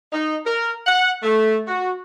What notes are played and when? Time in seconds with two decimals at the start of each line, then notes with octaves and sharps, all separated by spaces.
0.11 D#4
0.45 A#4
0.86 F#5
1.23 A3
1.67 F#4